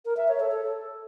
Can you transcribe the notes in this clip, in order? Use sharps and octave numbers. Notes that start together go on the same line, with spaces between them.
A#4
E5
C#5
A4
A4